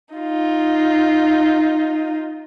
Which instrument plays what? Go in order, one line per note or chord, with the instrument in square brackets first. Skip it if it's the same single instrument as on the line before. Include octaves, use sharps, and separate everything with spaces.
[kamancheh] D#4 F4